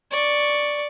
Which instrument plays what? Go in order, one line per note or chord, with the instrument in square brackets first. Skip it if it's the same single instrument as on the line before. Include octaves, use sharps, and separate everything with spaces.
[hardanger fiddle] D5 C#6